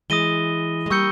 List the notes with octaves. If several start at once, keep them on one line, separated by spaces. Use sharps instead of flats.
E3 G#3 D#6 A#6 D#7 G7
G#3
G3 A#3 C#6 E6 G6 C#7 G7